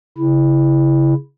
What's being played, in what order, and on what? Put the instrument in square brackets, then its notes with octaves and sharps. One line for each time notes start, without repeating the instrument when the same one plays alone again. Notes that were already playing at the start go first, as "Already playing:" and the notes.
[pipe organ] C#3 E4